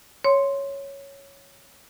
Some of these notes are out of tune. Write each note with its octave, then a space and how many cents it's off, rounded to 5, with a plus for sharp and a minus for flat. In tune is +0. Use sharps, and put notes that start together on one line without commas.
C#5 +0 C6 +0